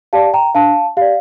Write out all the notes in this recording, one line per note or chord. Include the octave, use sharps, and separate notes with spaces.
G4 D5 F5 A5
G5 A#5
D4 F5 A5
G4 D5 F5